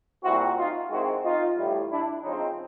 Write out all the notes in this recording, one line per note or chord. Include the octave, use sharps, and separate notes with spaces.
A#2 G3 C4 E4 F#4
D#4 F4
D#3 G#3 C4 E4 F#4
D#4 F4
A2 E3 G3
D4 E4
C#3 F3 G#3 C4 C#4 D#4